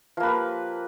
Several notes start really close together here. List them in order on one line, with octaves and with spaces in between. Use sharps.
F3 A#3 B4 G4